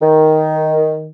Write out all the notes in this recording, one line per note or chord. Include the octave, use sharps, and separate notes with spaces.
D#3